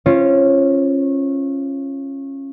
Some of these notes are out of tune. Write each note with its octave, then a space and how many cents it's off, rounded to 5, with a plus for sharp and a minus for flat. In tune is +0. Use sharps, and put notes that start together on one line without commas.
C#4 -20 F4 -25 C5 +0